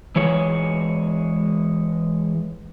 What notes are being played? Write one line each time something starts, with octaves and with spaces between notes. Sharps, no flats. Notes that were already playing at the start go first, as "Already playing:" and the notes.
E3 G#3 C#5